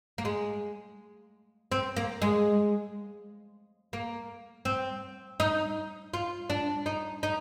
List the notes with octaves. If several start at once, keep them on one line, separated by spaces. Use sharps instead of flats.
A#3
G#3
C4
A#3
G#3
A#3
C4
D#4
F4
D4
D#4
D#4